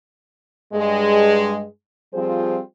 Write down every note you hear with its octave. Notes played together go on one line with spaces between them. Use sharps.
G2 G#3
F3 G3 C4 F4 G#4 C5